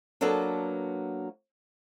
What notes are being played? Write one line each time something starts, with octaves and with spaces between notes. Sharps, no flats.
F#3 A#3 B3 D4 A4